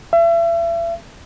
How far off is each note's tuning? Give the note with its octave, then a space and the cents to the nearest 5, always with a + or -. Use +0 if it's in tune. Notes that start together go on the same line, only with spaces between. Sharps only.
E5 +35